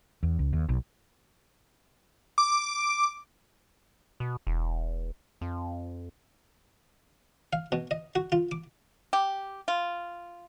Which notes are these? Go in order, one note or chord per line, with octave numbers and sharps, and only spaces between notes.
E2
C#2
D#2
B1
D6
B2
E1
F2
F5
B2
D#5
F#4
F4
D6
G4
F4